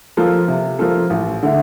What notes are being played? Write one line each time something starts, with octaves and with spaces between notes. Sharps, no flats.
F3 A#3 F4 A4
C3
F3 A#3 F4 A4
A1
D3 A3 E4